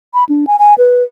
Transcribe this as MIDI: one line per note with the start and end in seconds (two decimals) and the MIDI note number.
0.14 0.24 83
0.29 0.45 62
0.47 0.56 80
0.59 0.74 80
0.78 1.03 71